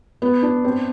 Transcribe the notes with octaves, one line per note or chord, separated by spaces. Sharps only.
B3
D4
C4